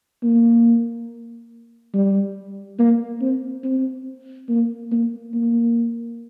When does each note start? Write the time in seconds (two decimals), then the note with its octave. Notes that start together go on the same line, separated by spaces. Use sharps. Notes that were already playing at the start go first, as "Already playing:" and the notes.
0.23 A#3
1.94 G3
2.79 A#3
3.21 C4
3.64 C4
4.49 A#3
4.92 A#3
5.34 A#3